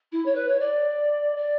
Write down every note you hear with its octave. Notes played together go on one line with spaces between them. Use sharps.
E4
C#5
B4
C#5
D5
D5